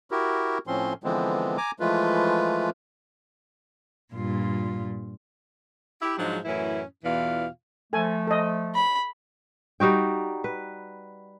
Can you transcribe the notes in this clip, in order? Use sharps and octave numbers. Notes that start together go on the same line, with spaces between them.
E4 F#4 G4 A#4
A2 F3 C4 C#4 C6
D3 E3 F3 G#3 B3 C4
G#5 A#5 D6
E3 F3 G#3 A3 F4 B4
G2 A#2 F4
E4 G4 E5
G#2 F3 F#3 G#3 D4
F#2 A2 E3 C#4 E4
E2 B2 E3 F4 D5 F5
F3 A3 A4 G#5
A4 D#5
B5
G3 D#4 F#4 G5
B4